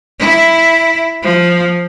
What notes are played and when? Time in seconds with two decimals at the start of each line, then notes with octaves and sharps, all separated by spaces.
0.19 E4
1.22 F3